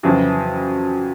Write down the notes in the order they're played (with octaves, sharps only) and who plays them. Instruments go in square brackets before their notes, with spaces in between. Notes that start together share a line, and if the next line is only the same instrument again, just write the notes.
[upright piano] F2 C#3 E3 F#3